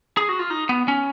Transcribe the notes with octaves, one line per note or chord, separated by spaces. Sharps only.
G#4
F#4
F4
D#4
B3
C#4